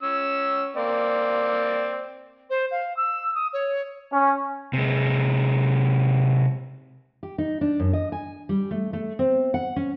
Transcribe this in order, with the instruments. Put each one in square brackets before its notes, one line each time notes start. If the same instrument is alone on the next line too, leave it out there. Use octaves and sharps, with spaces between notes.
[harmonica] C#4 E6
A#3 C4 D5
[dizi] C5
F5
E6
D#6
C#5
[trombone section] C#4
[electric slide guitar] C3 G#3
[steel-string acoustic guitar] G4
D#4
D4
F#2
D#5
G#5
G3
A3
A3
C4
F#5
C#4